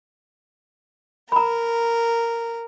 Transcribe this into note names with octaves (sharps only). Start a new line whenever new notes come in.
A#4 A#5 B5